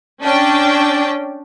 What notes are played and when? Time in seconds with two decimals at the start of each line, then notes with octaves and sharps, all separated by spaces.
0.23 C#4 D4 G5